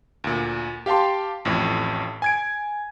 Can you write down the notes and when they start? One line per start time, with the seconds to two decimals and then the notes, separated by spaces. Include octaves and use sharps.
0.24 D2 A#2
0.86 G4 F5 G5 A5 C6
1.45 A1 F2 A2
2.22 G#5 G#6 D7